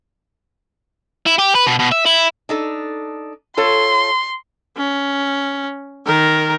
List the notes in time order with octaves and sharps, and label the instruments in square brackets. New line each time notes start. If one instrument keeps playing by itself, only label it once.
[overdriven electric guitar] E4
G4
B4
B2
B2
E5
E4
[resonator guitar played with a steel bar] D4 D#4 A4
[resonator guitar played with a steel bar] F4 A4 C#5 [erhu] C6
[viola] C#4
D#3 A#4